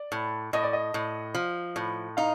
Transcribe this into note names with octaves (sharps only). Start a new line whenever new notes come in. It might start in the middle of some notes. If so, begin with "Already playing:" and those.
Already playing: D5
A2
A2 D#5
D5
D#5
A2
F3
A2
D#4 F5